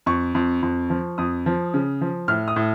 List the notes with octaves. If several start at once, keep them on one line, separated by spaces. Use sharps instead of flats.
F2 C#6
F2
F2
F3
F2 D#6
F3
C#3
F3
A2 F6
D#6
A2